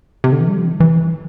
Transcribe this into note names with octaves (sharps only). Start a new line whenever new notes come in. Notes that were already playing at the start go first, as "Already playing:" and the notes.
C3
D3
E3
G3
F3
E3
D3
E3